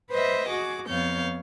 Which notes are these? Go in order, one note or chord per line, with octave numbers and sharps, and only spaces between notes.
B4 C5 D#5 E5
F#4 G#4 D6
F2 B3 C#5 F5 G6